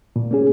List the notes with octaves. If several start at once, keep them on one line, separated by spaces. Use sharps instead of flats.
A#2
A#3 C#4 G#4